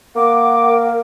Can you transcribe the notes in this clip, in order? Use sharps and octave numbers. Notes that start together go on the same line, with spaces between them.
A#3 F#5 D6
A#4